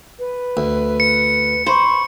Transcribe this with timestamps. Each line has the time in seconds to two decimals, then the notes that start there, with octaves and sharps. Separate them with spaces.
0.18 B4
0.57 D2
1.00 C#7
1.67 C5 B5 C#6